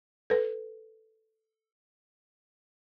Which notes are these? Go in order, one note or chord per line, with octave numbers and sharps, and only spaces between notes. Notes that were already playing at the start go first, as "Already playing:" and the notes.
A4 B4